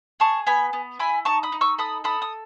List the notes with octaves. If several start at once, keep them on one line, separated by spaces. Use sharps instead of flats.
G#4 A5 C#6
B3 G#5 B5
B3
E4 G#5 B5
D#4 A5 C#6
B5 D#6
D#4
C#6 E6
A4 B5 D#6
A4 B5 D#6
D#6